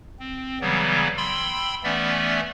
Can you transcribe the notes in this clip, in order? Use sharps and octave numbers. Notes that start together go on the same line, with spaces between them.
C4
C#3 E3 F#3 G3 B3
G5 B5 C6 E6
E3 A3 B3 C#4 D5 E5